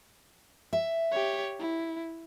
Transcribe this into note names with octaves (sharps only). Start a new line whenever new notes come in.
E5
G4 C#5
E4